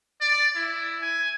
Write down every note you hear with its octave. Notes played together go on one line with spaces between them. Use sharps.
D5
E4
G#5